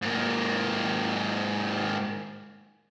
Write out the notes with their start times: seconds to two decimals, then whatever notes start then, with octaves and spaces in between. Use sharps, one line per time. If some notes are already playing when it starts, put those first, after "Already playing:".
0.02 G#2 A#3